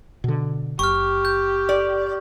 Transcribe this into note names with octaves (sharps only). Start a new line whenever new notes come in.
B2 D3
F#1 G4 C#6 F6
G6
D5